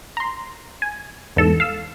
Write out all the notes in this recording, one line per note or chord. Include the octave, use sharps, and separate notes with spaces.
A#5 C6
G#5
E2 G#2 A4 E7
F5 E6